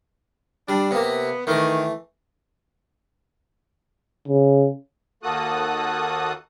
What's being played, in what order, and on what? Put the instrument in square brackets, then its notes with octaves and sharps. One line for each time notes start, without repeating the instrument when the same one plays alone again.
[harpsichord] G3 [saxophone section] D4
[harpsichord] C3 A#3 [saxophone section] B3
[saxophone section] D#3 [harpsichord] E3 A3
[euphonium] C#3
[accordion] D#2 A#3 F#4 A4 D#6 F#6